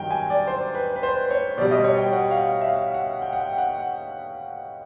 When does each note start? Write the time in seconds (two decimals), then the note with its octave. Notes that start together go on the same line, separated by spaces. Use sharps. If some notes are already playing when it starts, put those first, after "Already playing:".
Already playing: G2 D#3 F#3 G5
0.11 G#5
0.30 D5
0.47 C5
0.75 B4
0.96 B4
1.03 C5
1.31 C#5
1.58 B2 D5
1.61 G3
1.71 D#5
1.84 C#5
1.98 G5
2.13 F#5
2.31 F5
2.61 E5
2.67 F5
2.94 F#5
3.22 G5
3.33 F#5
3.41 G5
3.58 F#5